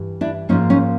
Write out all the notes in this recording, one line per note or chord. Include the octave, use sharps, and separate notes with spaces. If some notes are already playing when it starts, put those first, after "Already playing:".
Already playing: G2 E3
D4 E4
G#2 F3 A#3 C#4 D#4
C#4 D#4